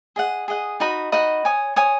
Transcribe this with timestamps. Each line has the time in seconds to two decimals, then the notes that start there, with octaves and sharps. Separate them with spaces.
0.16 G#4 D#5 F#5
0.48 G#4 D#5 F#5
0.80 D#4 F#4 D#5 B5
1.12 D#4 F#4 D#5 B5
1.45 C#5 G#5 D#6
1.76 C#5 G#5 D#6